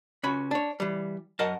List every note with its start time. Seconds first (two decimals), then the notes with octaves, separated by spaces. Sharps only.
0.23 C#2 C#4 F#4 B5
0.51 D4 C#5
0.80 E3 G3
1.39 F#2 A#4 D#5 F#5 A5